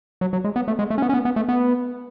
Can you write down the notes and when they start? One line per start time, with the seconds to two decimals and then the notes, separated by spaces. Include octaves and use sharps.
0.21 F#3
0.33 F#3
0.44 G#3
0.56 B3
0.68 A3
0.79 G#3
0.90 A3
0.98 C#4
1.02 B3
1.09 C#4
1.14 B3
1.25 B3
1.36 A3
1.49 B3